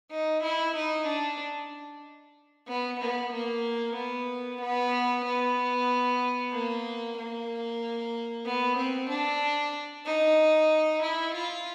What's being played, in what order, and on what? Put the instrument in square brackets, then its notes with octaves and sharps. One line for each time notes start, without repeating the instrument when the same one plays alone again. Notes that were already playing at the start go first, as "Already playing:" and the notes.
[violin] D#4
E4
D#4
D4
B3
B3
A#3
B3
B3
B3
A#3
A#3
B3
C4
D4
D#4
E4
F4